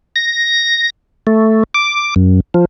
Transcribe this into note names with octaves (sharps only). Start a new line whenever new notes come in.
A#6
A3
D6
F#2
F3